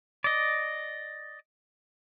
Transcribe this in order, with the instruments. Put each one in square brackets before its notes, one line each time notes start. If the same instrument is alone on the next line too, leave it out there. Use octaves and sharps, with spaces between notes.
[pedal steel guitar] D5 D#5